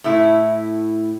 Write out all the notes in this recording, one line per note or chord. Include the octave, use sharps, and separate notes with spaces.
A2 A3 E4